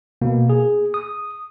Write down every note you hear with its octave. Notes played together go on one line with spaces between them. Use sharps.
B2 A#3
G#4
D#6